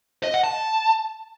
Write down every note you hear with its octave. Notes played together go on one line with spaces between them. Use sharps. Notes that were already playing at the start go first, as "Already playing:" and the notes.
D#5
F#5
A5